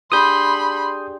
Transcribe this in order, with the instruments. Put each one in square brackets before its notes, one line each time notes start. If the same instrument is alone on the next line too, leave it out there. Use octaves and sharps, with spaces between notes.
[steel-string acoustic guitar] D4 G4 G#4 [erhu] B5 [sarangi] C6 [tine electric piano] D#6 G6